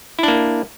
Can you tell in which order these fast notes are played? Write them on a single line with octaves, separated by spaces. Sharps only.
E4 D4 A#3